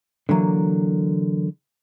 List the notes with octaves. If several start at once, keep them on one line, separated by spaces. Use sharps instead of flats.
D3 E3 F#3 A#3